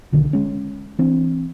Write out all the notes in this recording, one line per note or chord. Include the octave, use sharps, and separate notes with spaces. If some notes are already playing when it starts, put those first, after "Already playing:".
B1 D3 D#3
G#3 C#4
E3 C4 D4